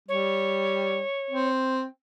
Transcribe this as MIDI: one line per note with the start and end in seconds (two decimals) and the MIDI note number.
0.09 1.03 55
0.09 1.49 73
1.31 1.85 60